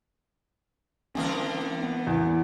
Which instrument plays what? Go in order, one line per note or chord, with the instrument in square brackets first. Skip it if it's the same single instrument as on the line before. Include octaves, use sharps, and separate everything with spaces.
[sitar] D3 E3 A#4 [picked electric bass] A#3 C4 C#4
[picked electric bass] B3
[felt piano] E2